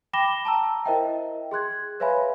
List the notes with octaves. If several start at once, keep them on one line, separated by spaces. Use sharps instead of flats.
G5 B5 D6 A#6 E7 G7
A5 A#5 E6
E4 A#4 C5 D#5 E5 G5
G#4 C6 F#6 G#6
B4 C#5 E5 F5 G#5 B5